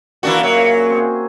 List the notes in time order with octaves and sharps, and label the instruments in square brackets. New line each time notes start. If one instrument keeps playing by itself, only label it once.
[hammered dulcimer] A#2 A#3 [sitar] E3 D4 F#4
[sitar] F#3 [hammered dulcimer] E5
[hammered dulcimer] C#3
C4 G#4